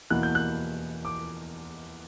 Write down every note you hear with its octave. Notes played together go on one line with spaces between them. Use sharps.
E2 B2 A#3 E4 F#6
G6
F#6
D6